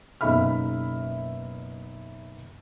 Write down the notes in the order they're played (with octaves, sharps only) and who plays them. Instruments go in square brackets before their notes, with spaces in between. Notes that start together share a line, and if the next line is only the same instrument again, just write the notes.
[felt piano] F#1 B2 D#4 E5 B5 F6